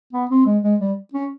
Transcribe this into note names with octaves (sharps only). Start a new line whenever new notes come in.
B3
C4
G#3
G#3
G3
C#4